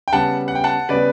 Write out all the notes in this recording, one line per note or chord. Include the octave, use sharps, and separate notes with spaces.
G5
C#3 G3 B3 F#5 A5
F#5
G5
F#5 A5
C#3 G3 B3 B4 D5